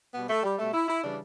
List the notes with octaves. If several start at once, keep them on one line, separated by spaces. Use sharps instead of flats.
B2 G3 B3
A3
G3
B2 G3 A3
E4
E4
C#3 E3 G3 D4